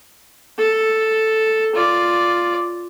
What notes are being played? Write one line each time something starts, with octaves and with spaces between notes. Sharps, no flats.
A4
F4 D5